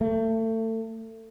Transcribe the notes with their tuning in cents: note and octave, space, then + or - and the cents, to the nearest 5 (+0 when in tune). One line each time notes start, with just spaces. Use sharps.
A3 +30